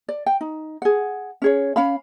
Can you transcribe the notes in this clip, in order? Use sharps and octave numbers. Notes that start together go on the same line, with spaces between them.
D5
G5
D#4
G#4 F#5
C#4 G#4 C#5
C#4 F5 B5